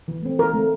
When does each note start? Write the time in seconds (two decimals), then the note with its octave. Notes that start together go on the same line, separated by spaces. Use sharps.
0.08 E3
0.22 A3 C4
0.39 E3 A#4
0.54 A3 C4